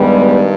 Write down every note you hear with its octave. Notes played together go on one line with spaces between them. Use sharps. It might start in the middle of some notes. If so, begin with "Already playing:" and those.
Already playing: G2 D#3 G3 G#3 B3